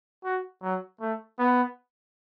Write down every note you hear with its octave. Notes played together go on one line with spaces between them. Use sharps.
F#4
F#3
A3
B3